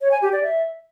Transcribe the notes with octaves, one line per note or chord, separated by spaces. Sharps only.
C#5
G#5
G4
D5
E5